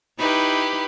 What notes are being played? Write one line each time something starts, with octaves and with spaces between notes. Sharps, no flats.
D#4 E4 G4 B4 B5